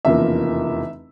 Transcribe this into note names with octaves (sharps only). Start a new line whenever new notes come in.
F1 E2 C#3 F3 A#3 E5